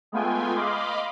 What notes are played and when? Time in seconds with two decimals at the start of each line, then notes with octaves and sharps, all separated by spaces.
0.12 G#3 A3 B3 F4 G5 G#5
0.55 D#5 F5 B5 C6 D6